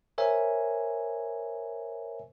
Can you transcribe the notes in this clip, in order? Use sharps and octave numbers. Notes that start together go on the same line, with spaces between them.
A#4 C5 C#5 E5 G#5